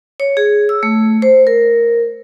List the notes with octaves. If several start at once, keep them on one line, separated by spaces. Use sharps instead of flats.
C#5
G#4
E6
A3
C5
A#4